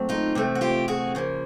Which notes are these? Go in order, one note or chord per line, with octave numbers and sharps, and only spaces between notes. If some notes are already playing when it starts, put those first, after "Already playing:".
Already playing: A#2 F#3 A3 C4
D#4 F4
C3 E3 A3 C4
F#4
F4 G4
F#4 G#4
C#3 F3 A#3